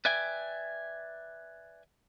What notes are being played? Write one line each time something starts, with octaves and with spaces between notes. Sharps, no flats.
B4 D5 E5 G5 G#5